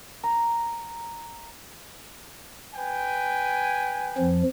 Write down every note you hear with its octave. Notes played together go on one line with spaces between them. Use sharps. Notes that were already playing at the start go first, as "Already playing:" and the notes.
A#5
B4 G5 G#5
F2 F3